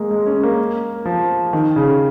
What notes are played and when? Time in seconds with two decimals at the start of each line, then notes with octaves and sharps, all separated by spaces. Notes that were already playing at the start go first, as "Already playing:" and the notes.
Already playing: G#3 A#3
0.11 G#3
0.26 C#4
0.43 A#3
1.05 F3
1.53 D#3
1.76 C#3